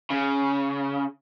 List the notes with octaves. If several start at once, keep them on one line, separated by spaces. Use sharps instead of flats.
C#3